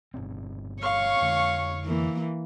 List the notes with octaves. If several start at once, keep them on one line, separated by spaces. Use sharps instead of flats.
G1 B2 C4
C#5 F5 C#6
F2 D3 G#3
E3 A#3